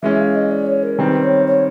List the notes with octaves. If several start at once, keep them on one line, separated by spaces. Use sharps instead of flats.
E3 G#3 C#4 E5
F5
D#5
D5
C#5
A#4
D#3 G3 C4 B4
C#5
C#5